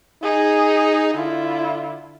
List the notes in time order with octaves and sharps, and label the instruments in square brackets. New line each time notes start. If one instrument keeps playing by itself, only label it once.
[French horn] D#4 [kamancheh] G#4
[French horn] D3 [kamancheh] E4 F4